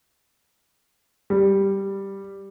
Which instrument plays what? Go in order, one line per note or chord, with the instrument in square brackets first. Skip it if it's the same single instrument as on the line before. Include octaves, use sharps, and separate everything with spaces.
[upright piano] G3